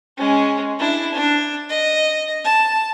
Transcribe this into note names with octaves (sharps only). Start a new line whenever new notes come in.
G#3 C#4
D4 E4
D4
D#5
A5